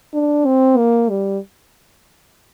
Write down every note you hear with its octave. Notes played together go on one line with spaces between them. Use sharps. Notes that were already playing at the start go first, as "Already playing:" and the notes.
D4
C4
A#3
G3